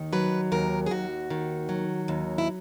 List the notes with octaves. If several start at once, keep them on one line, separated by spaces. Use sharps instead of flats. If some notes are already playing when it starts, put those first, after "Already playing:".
Already playing: D#2 D#3
F#3 B4
D#2 A#4
G#4
D#2 F#4
D#3
F#3
D#2
E4